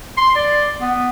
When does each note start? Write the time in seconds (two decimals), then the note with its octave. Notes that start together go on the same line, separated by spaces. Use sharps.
0.17 C6
0.35 D5
0.80 B3